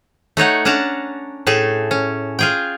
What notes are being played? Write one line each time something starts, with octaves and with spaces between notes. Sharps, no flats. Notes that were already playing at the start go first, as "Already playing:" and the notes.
A3 D#4 C#5 F#5
C#4 D4 F#5 A5 A#5
A2 A3 G#4 A4
C#4
F4 G#4 G5